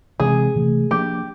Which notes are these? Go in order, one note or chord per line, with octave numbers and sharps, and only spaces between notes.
C3 E3 G#3 C4 G#4
C3 E3 A3
F3 A#3 D4 G4